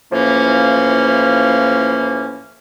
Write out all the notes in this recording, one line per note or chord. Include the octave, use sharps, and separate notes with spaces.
A2 E3 F3 A#3 C#4